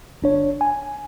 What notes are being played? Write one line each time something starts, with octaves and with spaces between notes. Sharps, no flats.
G1 D4 C#5
G#5